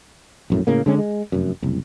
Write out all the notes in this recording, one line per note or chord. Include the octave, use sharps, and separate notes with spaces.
A#1 F#2 A2
A2 C#3 A#3
D3 G#3 C#4
G#3
F1 F#2
F#1 C2